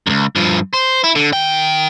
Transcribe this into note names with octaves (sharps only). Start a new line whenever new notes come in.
C#2 F#2
G2 F3
C5
E4
D3
D#3 G5